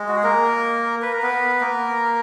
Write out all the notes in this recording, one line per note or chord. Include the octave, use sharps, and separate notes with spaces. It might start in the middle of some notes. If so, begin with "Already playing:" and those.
Already playing: G#3
F#4
G#4
A#3 A#4
B4
A#4
B3 B4
A#3 A#4